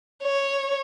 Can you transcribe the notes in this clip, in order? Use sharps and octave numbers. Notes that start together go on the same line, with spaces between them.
C#5